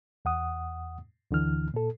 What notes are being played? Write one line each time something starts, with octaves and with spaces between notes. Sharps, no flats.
E2 F#5 D#6
D2 D3 E3 F6
A#2 A4